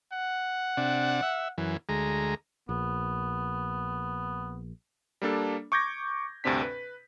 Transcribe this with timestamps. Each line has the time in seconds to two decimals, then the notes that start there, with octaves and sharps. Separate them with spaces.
0.13 F#5
0.77 C3 D4
1.23 E5
1.58 F#2 E3
1.89 D2 G#3 A#5
2.69 A#1 B3
5.22 G3 A#3 D4 A4
5.72 C#6 D6 G6 G#6 A#6
6.44 D2 G2 C3 C4 D4 B6
6.62 B4